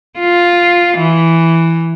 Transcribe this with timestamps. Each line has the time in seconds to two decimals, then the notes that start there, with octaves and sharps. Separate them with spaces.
0.19 F4
0.98 E3